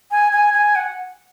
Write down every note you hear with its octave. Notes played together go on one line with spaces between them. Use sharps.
G#5
G#5
G#5
F#5